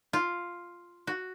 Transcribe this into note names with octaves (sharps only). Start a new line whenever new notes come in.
F4
F#4